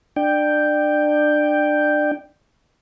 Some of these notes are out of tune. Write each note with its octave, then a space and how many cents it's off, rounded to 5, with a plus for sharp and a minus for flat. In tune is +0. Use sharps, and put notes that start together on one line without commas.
D4 +25 G5 +0